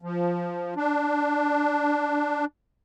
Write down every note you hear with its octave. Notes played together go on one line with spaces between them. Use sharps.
F3
D4